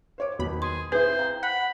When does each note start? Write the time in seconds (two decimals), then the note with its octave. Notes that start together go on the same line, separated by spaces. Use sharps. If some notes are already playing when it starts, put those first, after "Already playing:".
0.18 C5 C#5 D6
0.39 E2 B2 D#3 F#3 B5
0.62 G#4 C6
0.92 C4 E4 G#4 B4 C5
1.19 F5 G5 A#5
1.43 F#5 B5